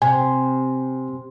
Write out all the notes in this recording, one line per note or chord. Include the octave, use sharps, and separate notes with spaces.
C3 G#5